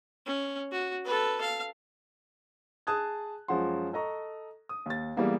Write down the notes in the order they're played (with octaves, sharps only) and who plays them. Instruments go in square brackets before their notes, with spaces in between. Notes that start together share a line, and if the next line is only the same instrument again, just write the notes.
[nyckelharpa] C#4
F#4
A4 B4
F5
[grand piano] G#4 A5 D#6 F#6 G#6
F#2 F3 G#3 F#5 C6
A4 D#5 A#5 C#6
D#6
D#2 A6
E3 G3 G#3 A#3 B3